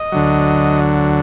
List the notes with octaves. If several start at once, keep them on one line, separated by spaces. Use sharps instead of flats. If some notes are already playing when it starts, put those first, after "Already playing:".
Already playing: D#5
D2 D3 F#3